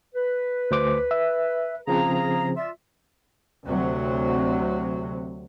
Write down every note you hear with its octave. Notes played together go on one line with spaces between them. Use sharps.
B4
D2 C5 D6
E5
C#3 F3 C4 G#4 F5 A#5
F4 D5 E5
D2 C3 F#3